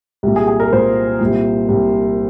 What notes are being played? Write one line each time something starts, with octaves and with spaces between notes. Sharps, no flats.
C2 A#2
G#4
G#4
A#4
C2 A#2 C5
C2 A#2
C2 A#2